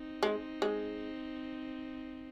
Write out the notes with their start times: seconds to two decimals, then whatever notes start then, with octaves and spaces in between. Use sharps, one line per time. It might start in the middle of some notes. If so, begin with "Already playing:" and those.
Already playing: C4 D#4
0.23 G#3
0.62 G#3